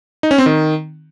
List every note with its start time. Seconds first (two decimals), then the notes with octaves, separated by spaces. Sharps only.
0.23 D#4
0.31 C#4
0.38 C4
0.46 D#3